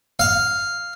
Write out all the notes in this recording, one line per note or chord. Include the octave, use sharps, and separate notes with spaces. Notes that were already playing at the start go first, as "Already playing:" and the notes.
F5